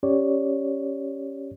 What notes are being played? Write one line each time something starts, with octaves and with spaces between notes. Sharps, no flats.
C#4 G4 C#5 D5